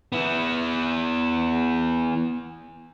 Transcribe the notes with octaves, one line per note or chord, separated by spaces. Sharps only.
B3 E4